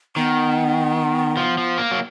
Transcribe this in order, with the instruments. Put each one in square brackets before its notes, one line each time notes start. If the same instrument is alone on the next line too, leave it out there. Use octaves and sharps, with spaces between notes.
[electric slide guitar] D#3 [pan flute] B3
[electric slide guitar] F3
F3
A#3
F#3